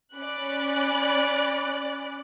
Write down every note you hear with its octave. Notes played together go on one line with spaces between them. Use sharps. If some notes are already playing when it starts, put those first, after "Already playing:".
C#4 D5 B5 F#6